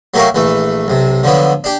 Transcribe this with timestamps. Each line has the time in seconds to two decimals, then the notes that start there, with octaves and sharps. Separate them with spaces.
0.14 F#3 A3 G4 A#4 C#5 F5
0.35 A#1 E3 A3
0.88 B1 C3
1.23 D3 F3 F#3 B3
1.64 D4 G4